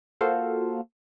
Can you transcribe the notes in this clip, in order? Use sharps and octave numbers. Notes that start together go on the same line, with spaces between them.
A#3 F4 F#4 A4 C5 F5